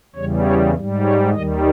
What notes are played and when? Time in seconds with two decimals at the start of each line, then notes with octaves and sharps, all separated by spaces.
0.16 E2 C#3 G3 C#5
0.45 C#5
0.75 G#2 G3
1.04 C#5
1.33 D#2 D#3 G3 D#5